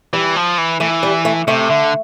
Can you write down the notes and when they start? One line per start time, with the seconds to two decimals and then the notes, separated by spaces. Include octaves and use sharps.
0.13 E3 G3
0.36 F3
0.58 E3
0.80 E3 A3
1.03 G3
1.25 A3
1.47 C3 A3
1.70 D3